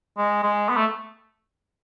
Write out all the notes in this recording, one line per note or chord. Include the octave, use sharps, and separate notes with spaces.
G#3
G#3
B3
A3